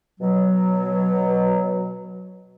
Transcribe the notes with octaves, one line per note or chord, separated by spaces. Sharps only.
B2 F#3